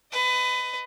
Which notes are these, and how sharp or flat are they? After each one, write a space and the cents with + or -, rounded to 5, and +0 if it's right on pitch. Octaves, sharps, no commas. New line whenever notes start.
B4 +25 D#5 +0